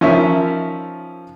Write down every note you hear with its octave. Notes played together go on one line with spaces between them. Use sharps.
F3 C#4 D#4 A#4 E5